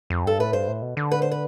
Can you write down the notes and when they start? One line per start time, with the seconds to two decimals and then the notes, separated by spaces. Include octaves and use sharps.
0.10 F2
0.25 G2 A4
0.39 A2 B4
0.53 G2 C5
0.68 A2
0.82 B2
0.97 D3
1.11 B4
1.22 C5
1.31 B4